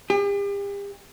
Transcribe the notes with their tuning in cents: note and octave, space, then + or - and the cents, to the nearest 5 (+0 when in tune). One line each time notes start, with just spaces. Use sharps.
G4 +40